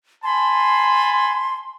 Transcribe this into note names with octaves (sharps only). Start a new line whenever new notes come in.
G#5 A5 B5 C6